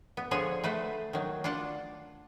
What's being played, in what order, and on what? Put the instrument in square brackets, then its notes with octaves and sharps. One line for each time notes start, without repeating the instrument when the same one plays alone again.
[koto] B3
D3 F3 G#4 C#5 F#5 G#5
A3 B4 C5 F#5
D#3 F#3
D4 F4 F#5 A5